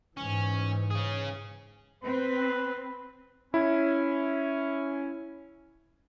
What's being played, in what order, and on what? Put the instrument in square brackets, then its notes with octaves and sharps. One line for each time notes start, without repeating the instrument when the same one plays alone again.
[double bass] G#2 E3 [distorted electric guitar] C#4
[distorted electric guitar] C#4 G#4
[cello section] C4 [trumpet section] B4
[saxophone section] C#4 [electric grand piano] E4